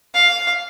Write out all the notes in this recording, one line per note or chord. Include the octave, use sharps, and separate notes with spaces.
F5